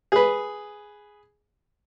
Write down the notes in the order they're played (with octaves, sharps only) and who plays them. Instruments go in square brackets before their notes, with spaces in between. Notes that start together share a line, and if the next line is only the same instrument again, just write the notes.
[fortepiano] G#4 B4